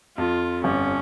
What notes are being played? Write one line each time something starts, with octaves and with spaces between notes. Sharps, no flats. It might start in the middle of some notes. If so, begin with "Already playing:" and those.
F2 F4
G1 C#4